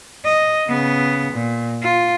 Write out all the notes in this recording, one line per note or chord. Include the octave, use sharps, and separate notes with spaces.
D#5
C#3 B3
A#2
F4